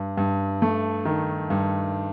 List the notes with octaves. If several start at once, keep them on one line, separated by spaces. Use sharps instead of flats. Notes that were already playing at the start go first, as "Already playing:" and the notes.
Already playing: G2
G2
A3
D#3
G2